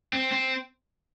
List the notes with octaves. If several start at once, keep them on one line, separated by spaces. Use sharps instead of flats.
C4
C4